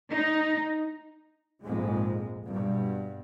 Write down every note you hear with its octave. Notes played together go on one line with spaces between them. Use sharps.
D#4
A#1 F2 G#2 G#3
G2 B2